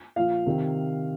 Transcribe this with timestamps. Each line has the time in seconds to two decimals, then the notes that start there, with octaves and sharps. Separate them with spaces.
0.16 A#2 F3 F5
0.46 C3 D#3